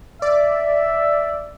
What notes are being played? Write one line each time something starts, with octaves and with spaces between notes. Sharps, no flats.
D5 E5